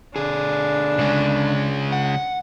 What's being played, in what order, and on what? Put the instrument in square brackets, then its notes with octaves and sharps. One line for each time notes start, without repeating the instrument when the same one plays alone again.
[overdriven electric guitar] D3 G#4 [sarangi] D4
[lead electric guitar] C#3 G#3
[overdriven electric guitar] F#5